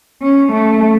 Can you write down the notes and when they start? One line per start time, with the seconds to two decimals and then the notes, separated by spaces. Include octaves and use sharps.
0.23 C#4
0.53 A3